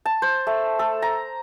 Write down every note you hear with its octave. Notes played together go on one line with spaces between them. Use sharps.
A5
C5
A3
A4
A#5